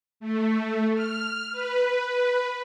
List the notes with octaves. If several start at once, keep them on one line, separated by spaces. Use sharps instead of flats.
A3
F6
B4